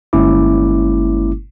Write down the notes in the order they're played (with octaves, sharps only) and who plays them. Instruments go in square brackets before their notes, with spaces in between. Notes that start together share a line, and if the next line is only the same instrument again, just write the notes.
[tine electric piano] G1 G#3 A#3 C#4 E4 D6